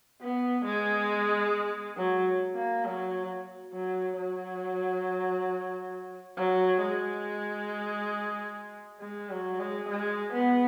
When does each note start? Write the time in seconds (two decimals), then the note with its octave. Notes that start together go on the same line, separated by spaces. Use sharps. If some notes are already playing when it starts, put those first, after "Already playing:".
0.21 B3
0.65 G#3
1.97 F#3
2.55 A#3
2.85 F#3
3.73 F#3
4.17 F#3
6.37 F#3
6.81 G#3
9.01 G#3
9.30 F#3
9.59 G#3
9.89 G#3
10.33 B3